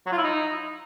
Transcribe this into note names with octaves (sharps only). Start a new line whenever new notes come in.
F#3
F4
E4
D#4